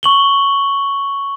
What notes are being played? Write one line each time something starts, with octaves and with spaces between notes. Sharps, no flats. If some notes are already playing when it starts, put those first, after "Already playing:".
C#6 F#7 G7